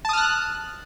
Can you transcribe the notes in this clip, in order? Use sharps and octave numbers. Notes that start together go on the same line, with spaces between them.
A5 D#6 F6 F#6